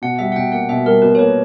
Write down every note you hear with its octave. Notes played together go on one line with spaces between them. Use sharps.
B2 F#5
G3 E5
F#5
B2 G5
A#3 F#5
B2 E5
G3 A#4
B2 B4
C#5
A#3 B4